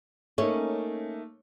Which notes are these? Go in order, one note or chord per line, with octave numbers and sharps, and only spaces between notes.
A3 A#3 C#4 D#4